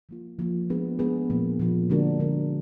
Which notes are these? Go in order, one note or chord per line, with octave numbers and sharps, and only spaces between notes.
F3 A#3 F4
F3 A#3 F4
G#3 B3 D4 G#4 B4
G#3 B3 D4 G#4 B4
A#2 F3 A#3
A#2 F3 A#3
D3 G#3 D4 F#4 A#4
D3 G#3 D4 F#4 A#4